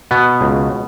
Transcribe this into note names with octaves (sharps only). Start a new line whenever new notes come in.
B2 B3
C#2